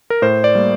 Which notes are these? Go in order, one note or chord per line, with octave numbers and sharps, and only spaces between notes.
A#4
A2 C5
D5
G3 A#3